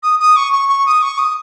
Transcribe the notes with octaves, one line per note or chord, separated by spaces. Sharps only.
D#6
D#6
C#6
C#6
C#6
D#6
C#6
D#6